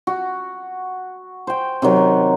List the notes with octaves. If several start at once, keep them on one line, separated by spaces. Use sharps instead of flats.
F#4
C5 G5
C3 D#3 F#3